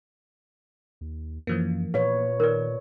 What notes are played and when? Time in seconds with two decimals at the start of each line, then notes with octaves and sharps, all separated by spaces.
1.01 D#2
1.47 F#2 E3 F3 A#3
1.94 A#2 B4 C#5 F5
2.40 D#3 A#4 D5